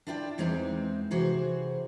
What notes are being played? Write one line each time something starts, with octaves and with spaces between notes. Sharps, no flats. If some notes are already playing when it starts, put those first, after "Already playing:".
D4 E4 F4 D5 G5
E2 E3 G#3 C4 D#4
C3 E3 F#4 G#4 C5